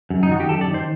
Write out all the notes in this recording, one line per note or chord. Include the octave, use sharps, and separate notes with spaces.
F#2
D#4
D#3 F#4
G4
F#2 A4
D5
D#3
C5